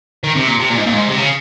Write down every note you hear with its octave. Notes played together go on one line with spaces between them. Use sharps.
D#3
C3
A#2
C3
A#2
G#2
A#2
G#2
C3
C#3